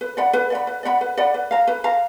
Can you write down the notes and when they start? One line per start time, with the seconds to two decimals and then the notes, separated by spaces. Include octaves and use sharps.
0.01 B4
0.17 D5 F#5 B5
0.33 B4
0.50 D5 F#5 B5
0.67 B4
0.83 D5 F#5 B5
1.01 B4
1.17 D5 F#5 B5
1.34 B4
1.51 F5 A#5
1.67 B4
1.84 F5 A#5